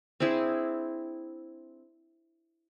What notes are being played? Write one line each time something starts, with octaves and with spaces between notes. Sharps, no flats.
C4 D4 E4 G#4